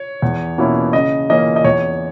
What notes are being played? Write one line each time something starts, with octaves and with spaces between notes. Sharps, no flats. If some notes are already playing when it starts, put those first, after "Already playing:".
Already playing: C#5
E2
B2 A#3 C#4 E4
C#3 D#5
E3 A#3 C#4 D#5
D#5
E2 C#5